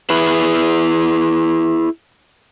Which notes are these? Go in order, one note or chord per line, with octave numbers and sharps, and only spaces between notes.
E4 G#4 B4